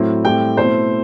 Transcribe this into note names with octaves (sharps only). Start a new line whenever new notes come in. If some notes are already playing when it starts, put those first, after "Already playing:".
Already playing: A2 F#3 C4 E4
A2 G3 C4 E4 G5
B2 A3 C4 E4 C5